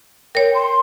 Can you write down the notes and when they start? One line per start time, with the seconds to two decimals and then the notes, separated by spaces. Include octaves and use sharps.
0.35 A#4 C#5 G5
0.54 C6